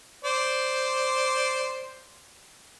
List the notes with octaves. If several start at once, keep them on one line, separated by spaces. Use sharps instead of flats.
C5 D5